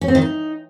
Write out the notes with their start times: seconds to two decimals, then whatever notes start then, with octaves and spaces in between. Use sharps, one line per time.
0.01 C#4
0.08 C4
0.15 D#3
0.22 D#4